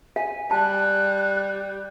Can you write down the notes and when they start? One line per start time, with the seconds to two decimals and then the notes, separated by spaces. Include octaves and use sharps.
0.16 F5 G#5
0.51 G3 A5 F#6